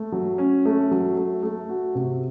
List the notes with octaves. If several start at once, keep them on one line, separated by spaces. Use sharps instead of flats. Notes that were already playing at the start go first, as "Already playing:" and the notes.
Already playing: A3
F#3
C#4
A3
F#3
A3
A3
F#4
C3